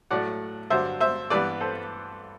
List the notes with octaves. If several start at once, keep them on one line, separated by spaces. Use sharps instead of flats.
A2 F#3 A3 D5 F#5
G2 D3 F#3 C5 E5
C5 E5
G2 E3 G3 B3 B4 D5
A4 C5